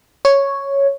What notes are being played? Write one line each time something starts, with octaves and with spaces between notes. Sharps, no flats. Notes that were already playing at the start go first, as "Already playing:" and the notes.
C#5